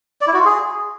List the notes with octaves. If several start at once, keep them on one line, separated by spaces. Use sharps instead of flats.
D5
E4
F#4
F4
G#4